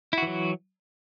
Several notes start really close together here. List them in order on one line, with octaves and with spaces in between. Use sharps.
E4 F#4 E3 F#3